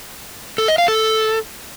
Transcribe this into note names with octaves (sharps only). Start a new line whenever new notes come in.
A4
D#5
F5
A4